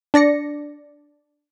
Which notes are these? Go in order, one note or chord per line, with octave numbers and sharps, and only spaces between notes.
D4 D5 A#6 C#7